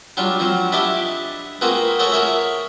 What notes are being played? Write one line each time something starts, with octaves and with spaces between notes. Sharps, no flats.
F#3 G3 D4 F4
F3 F#3 C4
D4 E4 G4 D#5 A5 D6
A#3 C4 F4 F#4 G#4 B4
F#4 G#4 A4 C#5 F#5 G5
G#4 A#4 C#5 E5